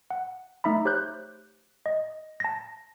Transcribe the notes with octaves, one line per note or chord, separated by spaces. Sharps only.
F#5
A3 D#4 E5 A#5 B5
G4 C5 C#5 F#6 G6
D#5
A5 A#6